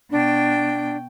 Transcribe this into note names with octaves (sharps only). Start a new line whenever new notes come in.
B2 D4 G5